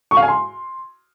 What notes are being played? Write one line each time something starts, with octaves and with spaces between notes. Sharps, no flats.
C#6
F5
G#5
C6